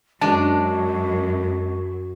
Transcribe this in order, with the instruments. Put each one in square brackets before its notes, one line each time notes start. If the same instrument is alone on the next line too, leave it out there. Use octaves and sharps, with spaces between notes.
[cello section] F#2 [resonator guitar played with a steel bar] G#3 D4 [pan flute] F#4 [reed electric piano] A5